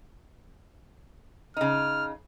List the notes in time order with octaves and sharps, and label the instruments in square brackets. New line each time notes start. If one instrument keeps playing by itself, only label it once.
[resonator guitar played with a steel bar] C#3 D#4 [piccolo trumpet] F6